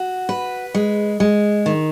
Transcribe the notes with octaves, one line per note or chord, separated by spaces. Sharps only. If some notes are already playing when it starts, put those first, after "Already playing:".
Already playing: F#4
B4
G#3
G#3
D#3